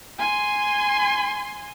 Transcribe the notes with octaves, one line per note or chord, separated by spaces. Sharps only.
G#5 C6